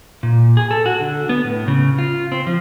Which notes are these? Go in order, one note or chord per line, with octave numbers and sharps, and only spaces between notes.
A#2
G#4
A4
F#4
D3
B3
A2
C#3
F4
C4
F3